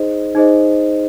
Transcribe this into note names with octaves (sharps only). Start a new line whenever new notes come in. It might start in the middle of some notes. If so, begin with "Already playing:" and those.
Already playing: D#4 G#4 C5 D#5
D#4 G#4 C5 D#5